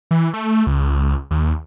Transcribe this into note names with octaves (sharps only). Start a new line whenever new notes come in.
E3
A3
C#2
D#2